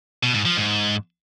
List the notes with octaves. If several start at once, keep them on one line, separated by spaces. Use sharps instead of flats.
B2
G#2
F3
G#2